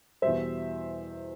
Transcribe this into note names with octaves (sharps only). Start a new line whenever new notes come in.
E2 B2 G3 C5 E5